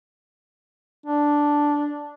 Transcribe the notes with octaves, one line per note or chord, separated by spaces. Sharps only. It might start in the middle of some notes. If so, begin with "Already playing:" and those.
D4